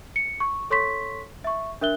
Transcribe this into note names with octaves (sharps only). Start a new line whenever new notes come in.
C#7
C#6
A4 C#5 C6 C#6 B6
E5 C#6
D4 A#4 E5 F#6 G7